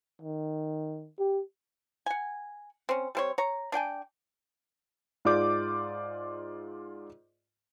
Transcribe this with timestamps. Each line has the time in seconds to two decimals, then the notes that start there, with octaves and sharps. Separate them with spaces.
0.22 D#3
1.19 G4
2.06 F#5 G#5
2.89 C4 C#4
3.15 G3 C4 C#5
3.38 C#5 A#5
3.72 D4 D5 G5 G#5
5.25 G#2 F4 G#4 D5 D6 G6